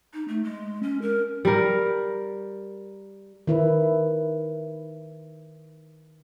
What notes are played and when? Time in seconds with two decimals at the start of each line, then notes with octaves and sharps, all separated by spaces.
0.14 D#4
0.28 A3
0.44 G#3
0.83 C#4
1.02 A#4
1.45 G3 A#4
3.47 D#3 E4 B4